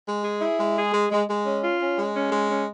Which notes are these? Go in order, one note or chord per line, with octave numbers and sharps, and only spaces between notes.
G#3
G#4
E4
G#3
G#4
G#3
G#3
G#3
C#4
F4
C#4
G#3
C#4
G#3
C#4